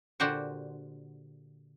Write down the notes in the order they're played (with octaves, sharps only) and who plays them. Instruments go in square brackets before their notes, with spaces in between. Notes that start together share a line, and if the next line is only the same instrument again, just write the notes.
[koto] A#2 D3 F#4 G4 C5 F#5